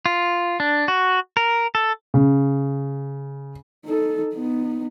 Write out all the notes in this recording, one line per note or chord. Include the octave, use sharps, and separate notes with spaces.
F4
D4
F#4
A#4
A4
C#3
D#4 A4
B3 D#4